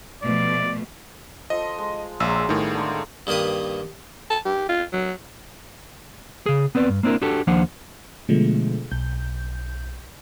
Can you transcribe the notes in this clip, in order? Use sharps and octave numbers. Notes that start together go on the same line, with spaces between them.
B2 F3 A3 D5
F3 A4 D#5 C6
G#3
A#1 F#3 G#3 F5 E6
A2 D#3 G3 B3 G#4
D3 G#3 A#3
G2 D#3 A#3 B4 D#6
A5
G4
F4
F#3
C#3 G#4
B3 C4 B4 D5
G2
A#3 C4 D4 E4 A#4
D4 F#4 G4 A4
D#2 F3 A#3 D4 C5 F#5
B2 D3 F3 G#3 A3
B1 G6